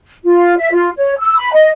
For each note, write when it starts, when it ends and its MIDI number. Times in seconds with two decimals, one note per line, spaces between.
0.24 0.57 65
0.57 0.68 76
0.72 0.90 65
0.96 1.14 73
1.19 1.37 88
1.38 1.51 83
1.53 1.70 75